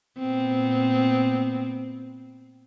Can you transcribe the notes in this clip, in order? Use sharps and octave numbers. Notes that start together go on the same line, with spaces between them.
A#2 B3 C4